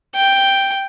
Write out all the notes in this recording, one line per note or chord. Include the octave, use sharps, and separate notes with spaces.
G5